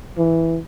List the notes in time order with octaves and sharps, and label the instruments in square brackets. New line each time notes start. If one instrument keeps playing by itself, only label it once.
[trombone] E3